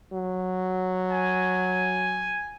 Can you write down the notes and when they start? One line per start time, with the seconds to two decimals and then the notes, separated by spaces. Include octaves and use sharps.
0.12 F#3
1.11 G#5